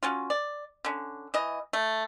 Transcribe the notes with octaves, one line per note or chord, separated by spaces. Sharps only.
F#3 C#4 F4
D5
D3 C#4
E3 D#5
A3